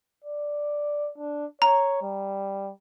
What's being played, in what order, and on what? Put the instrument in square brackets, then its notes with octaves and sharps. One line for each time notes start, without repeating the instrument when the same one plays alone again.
[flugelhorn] D5
D4
[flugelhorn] C#5 [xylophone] A#5
[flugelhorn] G3